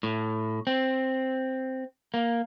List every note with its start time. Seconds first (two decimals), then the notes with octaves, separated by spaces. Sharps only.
0.03 A2
0.67 C4
2.14 A#3